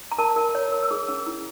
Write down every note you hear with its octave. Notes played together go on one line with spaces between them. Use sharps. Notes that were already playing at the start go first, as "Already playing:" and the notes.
A#5
A#4 A5
A#4
C#5
A#4
E6
G#4 D#6
C#4
E4